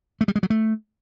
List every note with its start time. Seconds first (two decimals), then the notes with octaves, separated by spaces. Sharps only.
0.21 A3
0.28 G3
0.36 G#3
0.43 F#3
0.50 A3